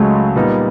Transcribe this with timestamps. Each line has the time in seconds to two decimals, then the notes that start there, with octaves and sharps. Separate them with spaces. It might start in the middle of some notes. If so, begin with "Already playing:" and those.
Already playing: C#2 C#3 F#3 G#3 A3
0.36 A#2 G3 B3 D#4